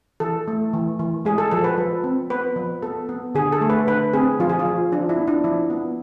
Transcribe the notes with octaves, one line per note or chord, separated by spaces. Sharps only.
E3 A4
A3
E3
E3
G#3 G#4
A4
F3 A4
B4
F3
C4
B3 B4
F3
B3 A4
B3
D3 G#4
A4
A3
B4
D3 B4
C4 G#4
F3 F4
G#4
F4
F3
F3 D4
E4
B3
D4
F3 E4
B3